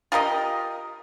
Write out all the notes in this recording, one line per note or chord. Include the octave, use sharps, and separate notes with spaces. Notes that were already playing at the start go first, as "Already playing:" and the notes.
F4 G4 A#4 D#5